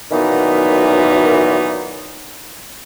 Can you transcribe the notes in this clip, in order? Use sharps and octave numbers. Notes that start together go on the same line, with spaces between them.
F#2 A#2 D#3 E3 B3 D#4